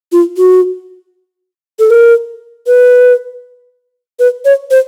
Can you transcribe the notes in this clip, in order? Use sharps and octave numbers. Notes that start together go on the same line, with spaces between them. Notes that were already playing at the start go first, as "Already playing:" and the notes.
F4
F#4
A4
A#4
B4
B4
C#5
C5